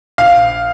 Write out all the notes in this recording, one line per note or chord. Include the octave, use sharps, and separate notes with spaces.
A#1 F5